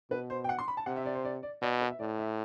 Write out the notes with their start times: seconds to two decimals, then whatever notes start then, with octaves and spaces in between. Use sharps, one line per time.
0.11 B2 B4
0.30 C5
0.44 G5
0.49 F#5
0.59 C6
0.68 B5
0.77 A5
0.86 C3 F#5
0.97 E5
1.06 D5
1.15 C5
1.25 D5
1.43 D5
1.62 B2 D5
1.81 B4
1.90 E5
1.99 A2 D5
2.19 E5